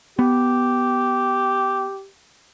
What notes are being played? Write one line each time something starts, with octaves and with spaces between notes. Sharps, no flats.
B3 G4